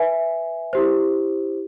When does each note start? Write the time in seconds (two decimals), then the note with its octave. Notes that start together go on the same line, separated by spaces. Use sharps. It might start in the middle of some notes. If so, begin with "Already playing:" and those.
Already playing: B4 E5 G#5
0.73 E4 G4 C5